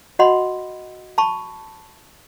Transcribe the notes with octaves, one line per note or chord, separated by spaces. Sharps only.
F#4 D#5 F#5 B5 C6
A5 B5 C#6